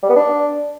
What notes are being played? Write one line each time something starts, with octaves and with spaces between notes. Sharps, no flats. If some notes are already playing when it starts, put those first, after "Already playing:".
G3
B3
D4